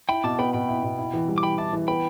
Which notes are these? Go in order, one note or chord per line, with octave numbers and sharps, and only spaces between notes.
E4 G5 B5
B2 A5 D6
B3 G5 B5
B2 G5 B5
E4
B2
E4
E3
G3
D6
E3 G5 B5
E4 A5 D6
E3
B3 G5 B5